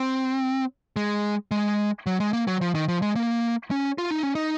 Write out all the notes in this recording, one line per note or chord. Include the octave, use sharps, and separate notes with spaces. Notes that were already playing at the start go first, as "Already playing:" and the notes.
Already playing: C4
G#3
G#3
F#3
G#3
A#3
F#3
F3
D#3
F3
G#3
A#3
C#4
F4
D#4
C#4
D#4